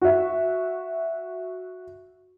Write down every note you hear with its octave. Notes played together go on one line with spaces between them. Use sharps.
F#4 E5